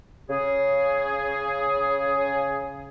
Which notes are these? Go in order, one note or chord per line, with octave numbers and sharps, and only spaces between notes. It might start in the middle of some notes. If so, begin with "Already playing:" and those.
C#3 G#4